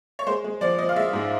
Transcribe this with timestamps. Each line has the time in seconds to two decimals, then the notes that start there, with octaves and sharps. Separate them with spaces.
0.19 C#5
0.27 G#3 C5
0.44 G#3
0.61 F3 D5
0.78 F3 D#5
0.89 F5
0.96 G#3 E5
1.13 G#2